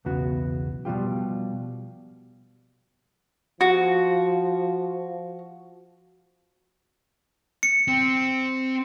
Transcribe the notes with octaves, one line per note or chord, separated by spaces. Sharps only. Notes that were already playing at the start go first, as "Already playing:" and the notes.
B1 E2 C#3 B3 F#4
B2 F3 G3 F4 G4
F3 F#4
C#7
C4